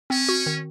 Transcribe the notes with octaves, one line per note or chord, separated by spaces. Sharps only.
C4 C#4
F#4
D#3